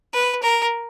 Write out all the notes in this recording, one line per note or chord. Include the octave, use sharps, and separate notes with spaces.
B4
A#4